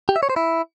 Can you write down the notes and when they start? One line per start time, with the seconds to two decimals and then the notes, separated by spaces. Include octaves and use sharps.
0.09 G4
0.16 E5
0.23 C#5
0.30 C5
0.36 E4